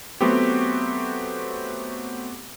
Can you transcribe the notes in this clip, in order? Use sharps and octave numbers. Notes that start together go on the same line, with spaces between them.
F#3 A3 B3 C4 F#4 G4